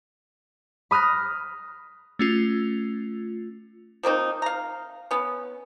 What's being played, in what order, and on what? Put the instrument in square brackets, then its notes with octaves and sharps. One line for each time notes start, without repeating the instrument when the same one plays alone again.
[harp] B5 D#6 F6 F#6 A#6
[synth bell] A3 C#4 F4
[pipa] F3 A#3 C4 D#4
F5 A#5
B3 C#4